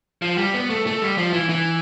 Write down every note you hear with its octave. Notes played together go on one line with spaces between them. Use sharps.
F3
G3
B3
A3
A3
G3
F3
E3
E3